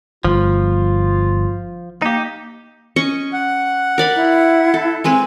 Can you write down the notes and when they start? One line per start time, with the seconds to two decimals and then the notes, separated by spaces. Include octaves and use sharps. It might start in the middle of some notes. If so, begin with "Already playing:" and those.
0.25 G1 F3 F4
2.02 A#3 D#4 G4
2.96 C#4 D#5 C#6
3.33 F#5
3.98 A#4 D5 B5
4.16 E4
4.74 A4
5.04 G#3 C4 B4 G#5